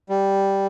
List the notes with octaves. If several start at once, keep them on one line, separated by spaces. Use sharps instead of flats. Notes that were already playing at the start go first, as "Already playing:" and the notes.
G3